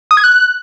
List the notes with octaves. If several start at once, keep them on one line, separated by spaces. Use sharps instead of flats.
D#6
G#6
F#6